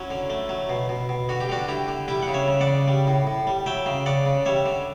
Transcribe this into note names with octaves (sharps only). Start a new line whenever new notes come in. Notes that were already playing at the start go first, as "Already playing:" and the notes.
Already playing: F#3 C#4 E4
D3
A3
F#3
B2
B2
B2
D3 F#4
G4
D3 D4 F#4
D3 E4 G4
D3
G3 E4 G4
F#5
C#3
C#5 E5
C#3
D5 F#5
C#3
G3
A2
A2
G3
F#3 E5 G5
C#3
C#3 D5 F#5
C#3
G3 C#5 E5
D3